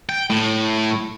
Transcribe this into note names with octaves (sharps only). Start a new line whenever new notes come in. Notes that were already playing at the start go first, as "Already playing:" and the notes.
G5
A2